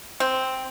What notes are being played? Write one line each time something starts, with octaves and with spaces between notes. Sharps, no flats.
C4